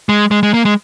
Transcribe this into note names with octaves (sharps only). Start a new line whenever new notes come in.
G#3
G#3
G#3
A#3
G#3